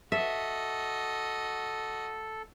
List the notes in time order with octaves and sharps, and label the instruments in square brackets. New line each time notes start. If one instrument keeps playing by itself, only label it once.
[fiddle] F#4 D#5 [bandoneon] A4 [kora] E5